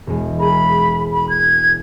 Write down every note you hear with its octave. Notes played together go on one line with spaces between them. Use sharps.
E1 G#3
G#4 A#4 B5
B5
G#6